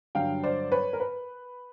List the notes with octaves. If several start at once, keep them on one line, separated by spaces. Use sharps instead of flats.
G2 D3 F#3 F5 G5
C5 D5
B4 C#5
A#4
B4